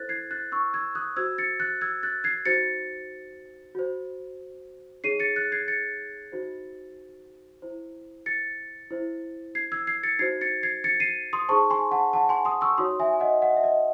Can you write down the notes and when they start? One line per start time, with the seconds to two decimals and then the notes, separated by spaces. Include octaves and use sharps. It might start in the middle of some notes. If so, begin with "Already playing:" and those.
Already playing: E4 A4 C5 F#6 A6
0.09 G#6 C7
0.31 F#6 A6
0.52 C#6 E6
0.74 E6 G#6
0.95 D#6 F#6
1.16 F#4 C5 E6 G#6
1.38 A6 C#7
1.60 F#6 A6
1.81 E6 G#6
2.03 F#6 A6
2.24 G#6 C7
2.45 D#4 F#4 C5 A6 C#7
3.75 F#4 C5
5.04 D#4 G#4 C#5 C7 D#7
5.20 A6 C#7
5.36 F#6 A6
5.52 G#6 C7
5.68 A6 C#7
6.32 D#4 F#4 C5
7.62 E4 C5
8.26 A6 C#7
8.91 E4 C5
9.55 G#6 C7
9.72 E6 G#6
9.87 G#6 C7
10.03 A6 C#7
10.19 D#4 F#4 C5 G#6 C7
10.41 A6 C#7
10.63 G#6 C7
10.84 A6 C#7
11.00 C7 D#7
11.33 C6 D#6
11.49 D#4 G#4 C5 A5 C#6
11.70 G#5 C6
11.91 F#5 A5
12.13 F#5 A5
12.29 G#5 C6
12.45 C6 D#6
12.61 C#6 E6
12.78 D#4 F#4 C#5 C6 D#6
13.00 E5 G#5
13.13 G#5
13.20 D#5 F#5
13.42 D#5 F#5
13.57 E5
13.64 D#5